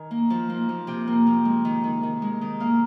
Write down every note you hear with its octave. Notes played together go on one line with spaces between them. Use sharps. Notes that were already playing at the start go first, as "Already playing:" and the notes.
Already playing: D#3 G#5
A#3
F3
A#3
F3
C3 G5
A#3
F3
G#3
D#3
D#3
D#3
G#3
D#3
A#3 F5